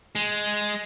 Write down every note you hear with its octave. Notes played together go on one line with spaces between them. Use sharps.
G#3